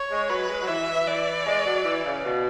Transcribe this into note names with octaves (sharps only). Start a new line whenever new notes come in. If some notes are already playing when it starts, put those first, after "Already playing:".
Already playing: C#5
G#3
F#3 B4
G#3
F#3
E3 E5
E3 D5
G#3
F#3
E3
C#3
B2